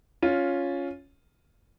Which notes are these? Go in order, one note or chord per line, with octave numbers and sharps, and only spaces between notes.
C#4 F4